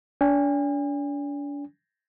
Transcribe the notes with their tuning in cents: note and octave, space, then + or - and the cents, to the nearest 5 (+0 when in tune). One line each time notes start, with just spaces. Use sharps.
D4 -40 G#5 -45